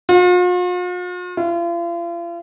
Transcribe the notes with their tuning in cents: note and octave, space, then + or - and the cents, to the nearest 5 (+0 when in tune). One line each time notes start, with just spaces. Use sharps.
F4 +45
F4 -40